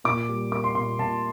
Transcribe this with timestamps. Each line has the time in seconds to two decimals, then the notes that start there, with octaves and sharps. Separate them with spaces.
0.04 A#2 D6
0.29 G3
0.52 A#3 D6
0.64 C6
0.75 A#2 C6
0.98 A#2 A5